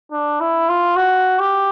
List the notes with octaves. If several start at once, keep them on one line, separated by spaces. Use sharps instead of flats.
D4
E4
F4
F#4
G4